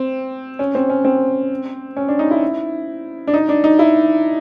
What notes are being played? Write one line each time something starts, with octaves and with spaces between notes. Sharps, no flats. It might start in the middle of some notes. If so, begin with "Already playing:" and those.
Already playing: C4
C#4
C4
C#4
C4
C#4
D4
D#4
E4
D4
D#4
D4
D#4
E4